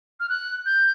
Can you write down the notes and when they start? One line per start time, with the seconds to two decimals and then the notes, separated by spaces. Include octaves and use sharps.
0.20 F6
0.29 F#6
0.66 G6